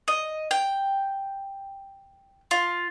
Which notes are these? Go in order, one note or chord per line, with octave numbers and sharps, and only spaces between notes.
D#5
G5
F4